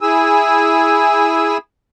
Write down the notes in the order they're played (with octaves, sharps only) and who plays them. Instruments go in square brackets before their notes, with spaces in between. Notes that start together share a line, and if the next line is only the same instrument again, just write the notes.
[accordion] E4 G#4 G#5 E6